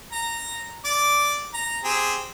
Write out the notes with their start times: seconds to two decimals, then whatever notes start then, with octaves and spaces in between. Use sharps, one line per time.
0.12 A#5
0.85 D5 D6
1.54 A#5
1.84 C4 G4 G#4